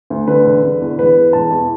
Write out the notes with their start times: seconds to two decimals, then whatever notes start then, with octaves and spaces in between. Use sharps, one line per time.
0.10 D2
0.28 D3 B4
0.45 E1
0.63 D3
0.81 E2
0.98 E1 B4
1.16 E2
1.33 E1 A5
1.51 E2